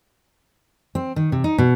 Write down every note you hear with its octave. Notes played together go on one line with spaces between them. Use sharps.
C4
D#3
C3
D#4
B2